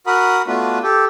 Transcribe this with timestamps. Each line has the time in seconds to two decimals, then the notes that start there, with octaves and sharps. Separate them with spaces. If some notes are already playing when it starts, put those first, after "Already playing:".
0.07 F#4 A#4 F#5 B5 D#6
0.47 A3 B3 D4 F4 F#4 B4
0.83 G4 A4